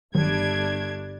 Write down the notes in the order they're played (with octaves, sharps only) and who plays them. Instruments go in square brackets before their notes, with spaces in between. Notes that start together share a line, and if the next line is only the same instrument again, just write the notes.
[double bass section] G1 [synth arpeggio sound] D#3 F#3 [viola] G3 D4 [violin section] A3 G#6